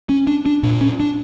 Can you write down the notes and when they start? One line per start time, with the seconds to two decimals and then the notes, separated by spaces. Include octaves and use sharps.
0.09 C#4
0.27 D4
0.46 D4
0.63 A#2 D4
0.81 C#4
1.00 D4